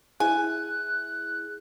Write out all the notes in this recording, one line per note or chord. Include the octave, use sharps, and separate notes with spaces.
E4 G#4 G#5 F#6